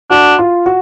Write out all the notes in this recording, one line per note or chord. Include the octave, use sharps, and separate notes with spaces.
D4 F#4
F4
F#4